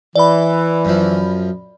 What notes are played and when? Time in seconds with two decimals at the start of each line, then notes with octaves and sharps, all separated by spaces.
0.16 E3 D5 B5
0.85 F#2 F3